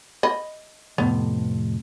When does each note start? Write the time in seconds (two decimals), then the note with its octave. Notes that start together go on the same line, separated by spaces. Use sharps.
0.23 D#5 B5
0.98 F2 A2 C3 B3